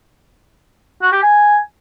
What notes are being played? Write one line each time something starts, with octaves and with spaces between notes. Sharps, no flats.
F#4
G4
G#5